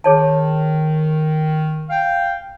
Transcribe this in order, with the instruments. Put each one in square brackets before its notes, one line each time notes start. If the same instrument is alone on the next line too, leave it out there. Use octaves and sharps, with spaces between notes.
[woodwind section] D#3 [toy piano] G#4 C#5 A5
[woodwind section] F5 G5